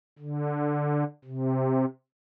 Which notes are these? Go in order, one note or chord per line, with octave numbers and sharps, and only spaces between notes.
D3
C3